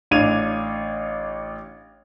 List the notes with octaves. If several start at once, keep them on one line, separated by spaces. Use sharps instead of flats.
A1 D4 F5 G#6 D#7 F7